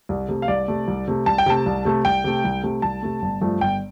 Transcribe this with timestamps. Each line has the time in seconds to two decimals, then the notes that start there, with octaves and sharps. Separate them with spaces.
0.09 C2
0.28 C3 A3
0.42 F5
0.48 C2 D5
0.68 C3 A3
0.88 C2
1.08 C3 A3
1.26 C2 A5
1.38 G5
1.46 C3 A3 A5
1.66 C2
1.85 C3 A3
2.05 C2 G5
2.24 C3 A3
2.44 C2
2.63 C3 A3
2.82 C2 A5
3.03 C3 A3
3.22 G1
3.41 G2 F3 A3
3.61 G1 G5